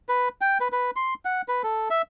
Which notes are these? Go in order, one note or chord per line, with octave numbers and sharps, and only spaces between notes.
B4
G5
B4
B4
C6
F#5
B4
A4
E5